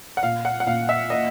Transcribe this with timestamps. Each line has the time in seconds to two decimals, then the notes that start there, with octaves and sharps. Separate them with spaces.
0.17 F#5
0.23 A#2 F5
0.45 F#5
0.60 F#5
0.66 A#2 F5
0.89 E5
1.10 A#3 D#5